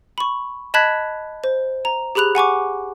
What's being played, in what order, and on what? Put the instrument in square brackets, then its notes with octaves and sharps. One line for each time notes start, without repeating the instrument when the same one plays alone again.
[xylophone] B5 C#6
D#5 A5 B5 F#6 G#6 B6
C5
A#5
G4 G#4 B5 F#6 F7
F#5 G#5 C#6 D6